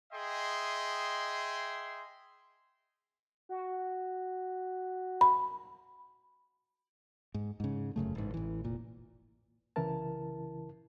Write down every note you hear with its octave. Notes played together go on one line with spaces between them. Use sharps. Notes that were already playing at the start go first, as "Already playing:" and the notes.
G#4 D#5 E5 G5 C6
F#4
B5
G#2
G#2 C#3
F1 F#2 C#3 A3
A1 G#2
A1 E3
F1 A#2
C2 C#3 E3 E4 A#4 A5